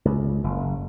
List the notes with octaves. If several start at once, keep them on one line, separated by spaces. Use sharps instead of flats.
C#2
F#1